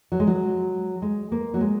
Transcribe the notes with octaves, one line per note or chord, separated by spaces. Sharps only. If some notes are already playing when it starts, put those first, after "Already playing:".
F#3
G#3
F#3
G#3
A#3
F#3
G#3